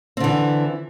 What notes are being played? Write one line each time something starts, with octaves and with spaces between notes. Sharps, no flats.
D3 E3 C4